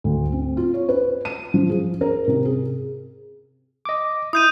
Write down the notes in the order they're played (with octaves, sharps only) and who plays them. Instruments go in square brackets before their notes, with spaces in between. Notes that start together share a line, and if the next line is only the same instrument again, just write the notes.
[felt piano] D2
C4
F4
C#5
B4
D#7
F3
G#4
A#4
C3
G#4
[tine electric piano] D#5 D6
[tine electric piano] E4 [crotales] D#6 G6 D#7